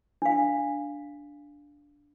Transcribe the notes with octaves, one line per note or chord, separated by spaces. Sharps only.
D4 F5